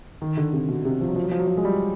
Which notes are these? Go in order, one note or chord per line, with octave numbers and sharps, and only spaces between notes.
D#3
D3
C3
B2
C3
F3
F#3
F3
F#3
F3
F#3
F3
G#3
G3